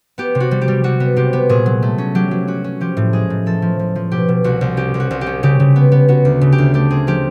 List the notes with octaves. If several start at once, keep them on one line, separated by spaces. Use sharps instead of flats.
B3 G4
C3
F#4
G3
G4
G3
G3 F#4
B3
C3 G4
B3
A#2 G#4
F#3
A3
C#4
F#3 G4
F#3
C#4 F#4
C#4
F3 G4
A2
G#3 G#4
A2
F3 A4
F3
F3
F3
B2 G4
B2
C2 F#4
C2
C#4 G4
C2
F#4
C2
G4
C#4
C#3 G4
C#3
B3
B3
B3 F#4
D2
C#3
G4
D2
A3 G4
C4 G#4
F3 G4